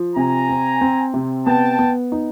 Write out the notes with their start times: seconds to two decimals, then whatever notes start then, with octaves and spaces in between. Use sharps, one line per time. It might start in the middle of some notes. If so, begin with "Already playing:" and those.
Already playing: F3
0.16 C3 G#5 A#5
0.49 C4
0.81 C4
1.14 C3
1.46 B3 G5 A5
1.79 B3
2.12 D#4